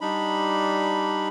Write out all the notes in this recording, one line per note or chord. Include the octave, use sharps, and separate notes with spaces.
G3 D4 D#4 B5